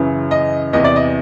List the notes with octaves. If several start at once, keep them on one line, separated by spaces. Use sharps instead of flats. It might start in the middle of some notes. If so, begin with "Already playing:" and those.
Already playing: F#2 C#3 E3
D#5
E2 C3 E3 D#5
D5
D#5